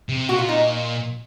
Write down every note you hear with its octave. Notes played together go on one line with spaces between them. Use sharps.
C3
A#2 F#4
F4
D#4